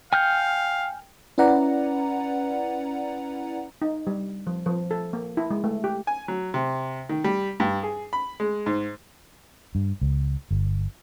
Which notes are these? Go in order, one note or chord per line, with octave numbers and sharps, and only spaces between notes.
F5 G5 G#5 F6 G6
C#4 E4 B4 D5 F#5 A#5
D#4
G3
F3
F3
A4
A#3
E4
G#3
A3
G4
G#5
F#3
C3
D#3
G3
G2
G#4
B5
G#3
G#2
G2
C#2
G1